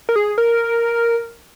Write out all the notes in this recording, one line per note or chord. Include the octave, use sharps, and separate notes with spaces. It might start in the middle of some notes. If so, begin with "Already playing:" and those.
A#4
G#4
A#4